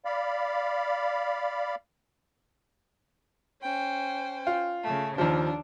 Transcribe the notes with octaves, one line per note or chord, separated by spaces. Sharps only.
D5 F5 B5
C#4 C5 G5
F4
C#3 A3
D#2 F3 D4